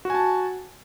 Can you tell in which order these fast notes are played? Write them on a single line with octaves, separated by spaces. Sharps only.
F#4 G#5 A5